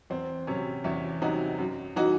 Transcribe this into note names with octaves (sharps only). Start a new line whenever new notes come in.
E2 C4
C3 F#3 C#4
E2 C#4 E4
C3 F#3 D#4 F#4
F#2
E3 D#4 F#4